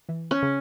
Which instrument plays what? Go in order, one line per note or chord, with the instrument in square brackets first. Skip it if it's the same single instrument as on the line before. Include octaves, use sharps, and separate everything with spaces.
[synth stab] E3
[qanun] C#4
[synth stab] C#3